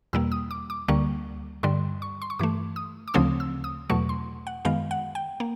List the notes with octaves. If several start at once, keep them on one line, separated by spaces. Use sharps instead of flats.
E2 B2 G3 A#3 E6
D#6
D6
D6
D2 D3 G3 A#3 C#6
G2 D3 G3 C6
C#6
C6
C#6
G2 E3 A3 D6
D#6
D6
D2 C#3 F3 A3 C4 D#6
E6
D#6
E2 B2 F#3 A3 C#6
C6
F#5
F#2 D#3 G#3 B3 F5
F#5
G5
A#3